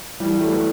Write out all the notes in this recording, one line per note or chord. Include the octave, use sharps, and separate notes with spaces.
E3 G3
F#3 A3
B3